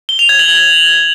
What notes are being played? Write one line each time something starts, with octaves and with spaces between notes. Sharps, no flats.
G7
F7
G#6
F#7